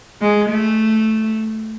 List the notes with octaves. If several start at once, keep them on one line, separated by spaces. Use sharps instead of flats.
G#3
A3